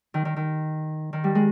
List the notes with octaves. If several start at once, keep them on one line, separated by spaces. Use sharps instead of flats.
D#3
D#3
D#3
D#3
G3
G#3